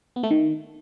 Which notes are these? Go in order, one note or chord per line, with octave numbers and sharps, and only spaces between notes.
B3
A3
D#3